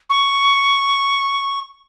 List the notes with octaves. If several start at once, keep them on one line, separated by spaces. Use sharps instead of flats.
C#6